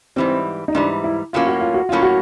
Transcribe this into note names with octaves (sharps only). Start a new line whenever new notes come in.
G#2 E3 G3 C4
D#4
G#2 E3 G3 D4
E4
A2 F#3 A#3 C#4 F4
F#4
F4
F#4
A2 F#3 A#3 C#4 F4
F#4